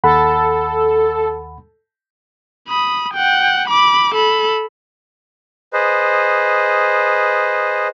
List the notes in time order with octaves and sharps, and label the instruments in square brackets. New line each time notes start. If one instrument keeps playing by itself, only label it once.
[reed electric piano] D#2 F#5 B5 [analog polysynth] A4
[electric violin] B5 D#6
F#5 G5
B5 D6
A4 B5
[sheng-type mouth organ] G#4 B4 C5 D#5